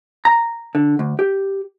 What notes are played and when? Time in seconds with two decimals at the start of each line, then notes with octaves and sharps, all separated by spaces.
0.25 A#5
0.75 D3
0.99 D2
1.19 G4